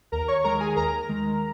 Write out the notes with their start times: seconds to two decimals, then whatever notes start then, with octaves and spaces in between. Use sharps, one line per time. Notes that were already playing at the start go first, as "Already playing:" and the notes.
0.12 D#2 A#4 A#5
0.28 C#5 C#6
0.44 D#3 G#3 A#4 A#5
0.60 G#4 G#5
0.76 D#2 A#4 A#5
1.09 D#3 G#3